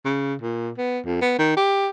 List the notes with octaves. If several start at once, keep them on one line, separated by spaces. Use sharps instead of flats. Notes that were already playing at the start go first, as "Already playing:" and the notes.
C#3
A#2
B3
F2
B3
D#3
G4